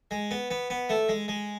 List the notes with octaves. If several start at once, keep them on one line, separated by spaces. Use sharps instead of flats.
G#3
B3
B3
B3
A3
G#3
G#3